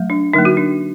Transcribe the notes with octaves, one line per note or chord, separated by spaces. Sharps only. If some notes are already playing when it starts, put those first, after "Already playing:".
Already playing: F#3 A3
D4
D3 F#3 A#3 D#4
F#4
D4